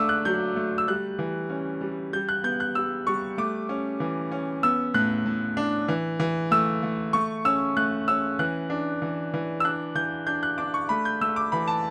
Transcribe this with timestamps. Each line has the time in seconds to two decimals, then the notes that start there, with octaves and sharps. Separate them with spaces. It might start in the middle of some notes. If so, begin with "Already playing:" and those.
Already playing: A3 D4 D6 E6
0.09 F#6
0.25 F#3 G6
0.56 A3
0.78 E6
0.88 G3 F#6
1.19 E3
1.50 C#4
1.81 G3
2.13 G3 G6
2.29 F#6
2.44 B3 G6
2.60 F#6
2.75 G3 E6
3.07 G3 C#6
3.38 A3 D6
3.69 C#4
4.00 E3
4.32 C#4
4.63 B3 E6
4.94 A2 F#6
5.26 A2
5.57 D4
5.88 E3
6.20 E3
6.51 A3 E6
6.83 A3
7.13 A3 C#6
7.45 C#4 E6
7.77 A3 F#6
8.08 C#4 E6
8.39 E3 F#6
8.70 D4
9.02 E3
9.34 E3
9.60 E6
9.64 D4 F#6
9.95 E3 G6
10.27 D4 G6
10.43 F#6
10.58 D4 D6
10.74 C#6
10.89 A3 B5
11.05 G6
11.21 A3 E6
11.36 D6
11.52 E3 B5
11.68 A5